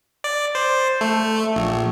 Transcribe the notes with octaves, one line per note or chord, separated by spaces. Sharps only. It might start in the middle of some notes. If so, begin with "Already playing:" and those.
D5
C5
A3
A#1